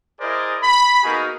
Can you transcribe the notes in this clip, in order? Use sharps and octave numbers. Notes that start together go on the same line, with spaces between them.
E4 G#4 A#4 C5 D5 D#5
B5
A#3 B3 D#4 F#4 G#4 A#4